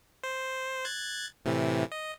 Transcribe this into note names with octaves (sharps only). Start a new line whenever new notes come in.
C5
F#6 G#6 A6
A2 C3 E3
D#5